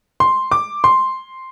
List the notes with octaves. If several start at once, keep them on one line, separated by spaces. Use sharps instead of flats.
C6
D6
C6